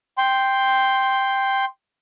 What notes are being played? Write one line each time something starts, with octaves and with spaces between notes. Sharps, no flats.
G5 C6